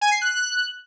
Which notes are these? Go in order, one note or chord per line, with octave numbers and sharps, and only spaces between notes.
G#5
C7
F#6